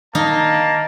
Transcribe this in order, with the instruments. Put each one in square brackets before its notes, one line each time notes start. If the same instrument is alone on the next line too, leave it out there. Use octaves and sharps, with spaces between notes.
[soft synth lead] D#3 [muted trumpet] A#3 [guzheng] D#4 [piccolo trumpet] A5